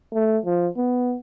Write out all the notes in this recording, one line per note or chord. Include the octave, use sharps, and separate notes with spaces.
A3
F3
B3